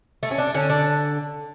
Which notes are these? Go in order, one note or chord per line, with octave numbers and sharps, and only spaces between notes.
A3
C#4
D4
D3 C#4
D4